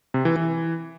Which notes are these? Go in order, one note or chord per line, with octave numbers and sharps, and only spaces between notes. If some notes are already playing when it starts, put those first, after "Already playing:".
C3
E3
E3